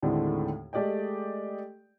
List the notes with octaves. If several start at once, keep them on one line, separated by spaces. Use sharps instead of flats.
D#2 A2 D3 G#3 A3 C4
G#3 A3 G4 D5 D#5 G5